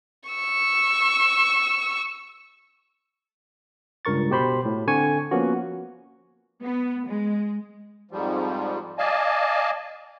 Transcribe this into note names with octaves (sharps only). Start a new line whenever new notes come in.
C#6 E6
C#2 G2 A#4 C#6 A6
B2 G4 C5 B5 C6
A2
D3 C4 G#5 C#6
F3 A#3 B3 C#4 F#4
B3
G#3
F2 G#2 F3 G3
D5 D#5 F5 G#5 A5